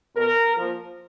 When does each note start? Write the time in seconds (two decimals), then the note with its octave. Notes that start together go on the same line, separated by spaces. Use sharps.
0.16 B2 A#4
0.57 A#2 F3